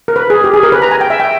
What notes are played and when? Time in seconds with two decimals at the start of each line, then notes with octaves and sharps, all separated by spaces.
0.08 A#4
0.16 B4
0.30 G#4
0.44 G4
0.54 G#4
0.63 A#4
0.72 B4
0.82 A#5
0.91 G#5
1.01 G5
1.10 E5
1.20 G5